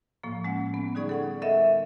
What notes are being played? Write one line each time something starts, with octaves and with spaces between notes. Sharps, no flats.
A2 F3 A#3
G#3 C#4 F#5
B3
D3 G3 D#4 G#4 D5 C#6
A4 F#5 C#6
A4 A#4 D#5 E5 F#5